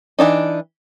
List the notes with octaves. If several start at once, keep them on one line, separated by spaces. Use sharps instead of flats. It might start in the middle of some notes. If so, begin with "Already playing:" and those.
E3 F#3 D4 D#4